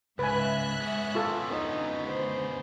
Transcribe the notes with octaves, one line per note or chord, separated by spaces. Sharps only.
C#2 G#2 B4 E5 G#5 F#6
B3 C#4
F4 A4
D2 D#4
C5